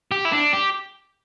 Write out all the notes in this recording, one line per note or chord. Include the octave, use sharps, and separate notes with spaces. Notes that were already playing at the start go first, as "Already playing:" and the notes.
G4
E4
D4
G4